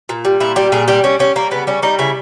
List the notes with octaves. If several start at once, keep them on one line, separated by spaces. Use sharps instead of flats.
A#2
G3
A#2 E4
G3 G4
A#2 G#4
G3 G4
G3 C#4
G3 C#4
G3 A#3
C#3 B3
G3 C#4
G3 D#4
C#3 E4